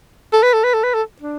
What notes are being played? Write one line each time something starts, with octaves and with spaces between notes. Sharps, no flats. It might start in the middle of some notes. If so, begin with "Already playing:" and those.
A4
B4
A4
B4
A4
B4
A4
D4